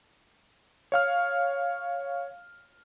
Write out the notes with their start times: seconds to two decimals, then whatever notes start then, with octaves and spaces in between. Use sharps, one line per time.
0.92 C#5 F5 F6